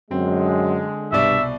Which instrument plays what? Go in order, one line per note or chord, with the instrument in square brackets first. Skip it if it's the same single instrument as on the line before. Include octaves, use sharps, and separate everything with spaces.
[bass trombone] F#2 [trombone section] D3 G#3 [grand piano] C4
[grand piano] C2 B2 D5 [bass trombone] G2 [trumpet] E5